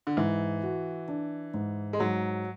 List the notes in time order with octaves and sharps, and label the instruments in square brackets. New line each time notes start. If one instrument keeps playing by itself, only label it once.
[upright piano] D3
[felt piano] G#2 [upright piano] E3
[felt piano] F#4
D4
G#2
[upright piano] G#3
[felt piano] G#2 [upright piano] F#3